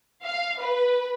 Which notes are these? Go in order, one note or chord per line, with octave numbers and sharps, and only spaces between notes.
F5
B4